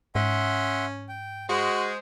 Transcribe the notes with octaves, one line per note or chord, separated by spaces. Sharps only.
G#2 C#4 E5 F#5 C6
G5
G#3 F#4 C5